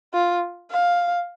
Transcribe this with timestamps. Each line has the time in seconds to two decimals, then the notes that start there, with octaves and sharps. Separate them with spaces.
0.14 F4
0.71 F5